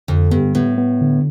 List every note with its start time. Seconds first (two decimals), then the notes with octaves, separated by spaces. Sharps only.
0.08 F2 D3
0.31 G2 B3
0.55 A2 B3
0.78 B3
1.01 D3